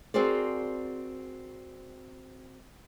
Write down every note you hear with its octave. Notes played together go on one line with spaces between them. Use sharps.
C4 F#4 G#4 A#4 C5 D5